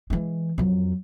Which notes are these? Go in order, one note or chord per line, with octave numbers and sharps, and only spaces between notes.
E3 G#3
F2 F#3